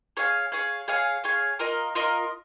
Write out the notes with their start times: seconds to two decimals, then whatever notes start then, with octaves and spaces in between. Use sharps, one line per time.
0.17 G#4 C#5 F5 G#5
0.52 G#4 C#5 F5 G#5
0.88 G#4 C#5 F5 G#5
1.24 G#4 C#5 F5 G#5
1.59 F4 A#4 D#5
1.95 F4 A#4 D#5